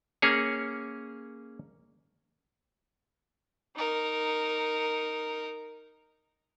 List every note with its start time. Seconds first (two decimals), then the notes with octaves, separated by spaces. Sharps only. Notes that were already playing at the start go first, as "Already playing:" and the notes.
0.22 A#3 C#4 G#4 C#5
3.76 D#4 A#4